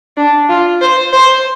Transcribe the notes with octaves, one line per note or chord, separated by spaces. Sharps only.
D4
F4
C5
C5